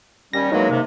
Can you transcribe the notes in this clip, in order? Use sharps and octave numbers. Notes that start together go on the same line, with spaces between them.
D#2 G3 C#4 A#6
E2 F#3 G#3 A#3 D#4
G#2 C3